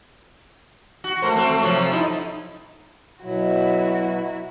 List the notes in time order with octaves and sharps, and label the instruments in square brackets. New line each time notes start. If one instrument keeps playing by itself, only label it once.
[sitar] F#4
A3 A#4 C5
A3 C4 F#4
A3
C3 F3 F#3
D#4 E4
[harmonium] B2 F#3 [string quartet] E4 F#4